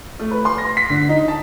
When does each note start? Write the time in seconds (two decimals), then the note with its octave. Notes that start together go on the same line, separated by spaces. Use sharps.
0.19 A3
0.31 B4
0.45 C6
0.58 A#6
0.77 B6
0.90 D3
1.09 D#4
1.28 A5